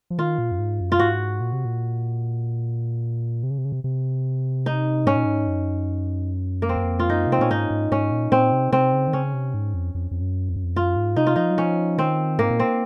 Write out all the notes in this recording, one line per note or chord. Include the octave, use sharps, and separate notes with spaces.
F3
D#3 F4
A#2
F#2
G#2
F#2
F4
G#2 F#4
A#2
C3
A#2
C3
C#3
C3
C#3
C3
C3
D#4
G#2 C#4
A#2
G#2
F#2
A#3
F2 C4
F#2
F2
F4
F#2 D#4
C3
C4
A#2 C#4
G#2 D#4
G#2
G#2 C#4
A#2
A#2 C4
C3
C3 C4
C#3
D#3
C#3 C#4
C3
G#2
F2
F2
F2
F#2
F2
F#2
F2
F#2 F4
G#2
C3 D#4
F4
F3 D#4
F#3
F3 C#4
D#3 C4
G#2 A#3
A#2
C4